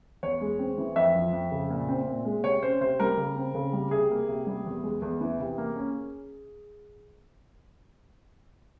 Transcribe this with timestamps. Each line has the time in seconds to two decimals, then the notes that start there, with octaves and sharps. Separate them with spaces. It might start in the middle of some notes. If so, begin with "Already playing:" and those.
0.23 E2 C#5
0.41 G#3
0.59 C4
0.78 E3
0.96 F2 E5
1.15 F3
1.33 F2
1.51 C#3
1.70 A#2
1.89 C4
2.07 A#2
2.25 G#3
2.44 C3 C#5
2.63 C#4 C5
2.81 C3 C5
3.00 G3 A#4
3.17 C#3
3.36 C4
3.55 C#3
3.73 G3
3.91 C3 G#4
4.11 A#3
4.28 C3
4.46 G3
4.66 E2
4.83 G#3
5.02 E2
5.21 E3
5.40 C3
5.58 A#3
5.76 C#4